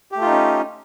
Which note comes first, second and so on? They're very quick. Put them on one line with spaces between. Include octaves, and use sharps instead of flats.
G4 A3 F4 D#4 C#4